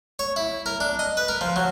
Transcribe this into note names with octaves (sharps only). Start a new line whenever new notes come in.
C#5
E4
A#4
D4
D#5
B4
A#4
F3
F#3